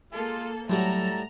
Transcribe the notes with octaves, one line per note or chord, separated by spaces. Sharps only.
G#3 A#3 F4 A4
A2 F#3 G3 F#4 A4 A5 A#5